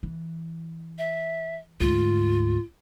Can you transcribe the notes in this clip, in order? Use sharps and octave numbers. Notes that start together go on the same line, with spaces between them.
E3
E5
D2 G#2 F4